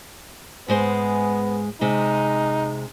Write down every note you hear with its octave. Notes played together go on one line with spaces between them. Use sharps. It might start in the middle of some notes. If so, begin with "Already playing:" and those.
G#2 G#3 B3 C5
C3 G#3 D#4